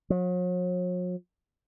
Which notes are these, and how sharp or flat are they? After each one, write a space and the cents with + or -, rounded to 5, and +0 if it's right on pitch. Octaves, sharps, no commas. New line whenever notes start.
F#3 -45